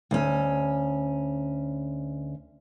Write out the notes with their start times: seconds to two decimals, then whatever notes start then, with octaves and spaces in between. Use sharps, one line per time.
0.11 D2 C#4